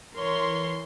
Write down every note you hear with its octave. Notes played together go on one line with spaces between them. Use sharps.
E3 A#4 C#5 C6